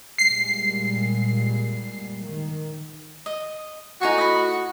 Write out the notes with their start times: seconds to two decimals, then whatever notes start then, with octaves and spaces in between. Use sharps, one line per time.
0.18 A#2 G3 G#3 C7
2.24 D#3
3.26 D#5
4.01 A2 D#4 F#4 G#5 C#6
4.18 D#5 B5